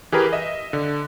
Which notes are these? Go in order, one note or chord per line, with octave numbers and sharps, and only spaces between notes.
E3 G4 G#4 A#4 B4
D#5 E5
D3